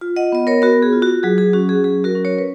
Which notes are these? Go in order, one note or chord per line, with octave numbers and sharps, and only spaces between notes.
F4
D#5 F#5
B3 D#5
A#4 C#5
B3 F#4 A#4
G#4
F4
F#4
F#3 G#4
G#4
C#4 F#4
G#4
F#3 G#4
F#4 A#4
C#4
A#4 C#5
B4